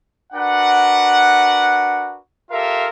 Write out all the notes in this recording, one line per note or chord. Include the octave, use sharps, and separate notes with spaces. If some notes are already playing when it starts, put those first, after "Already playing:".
D4 F#4 A#4 B4 F#5
F4 G4 A4 A#4 E5 F5